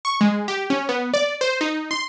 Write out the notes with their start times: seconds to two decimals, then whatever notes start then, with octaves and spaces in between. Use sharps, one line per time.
0.05 C#6
0.21 G#3
0.48 G4
0.70 C#4
0.89 B3
1.14 D5
1.41 C5
1.61 D#4
1.91 C6